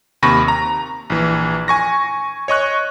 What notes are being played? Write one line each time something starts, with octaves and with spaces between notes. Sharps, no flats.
D#2 C3 B5 C#6 A#6
A#5
A#1 E3
G#5 C#6 A#6
C#5 D#5 C#6 F#6